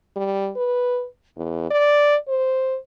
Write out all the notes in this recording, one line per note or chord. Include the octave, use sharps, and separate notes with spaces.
G3
B4
E2
D5
C5